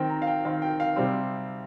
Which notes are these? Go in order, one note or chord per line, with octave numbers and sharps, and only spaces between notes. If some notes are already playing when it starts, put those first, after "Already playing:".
Already playing: D#3 C4 G5
A#5
F5
G5
D#3 C4 F5
G5
F5
C3 G3 C4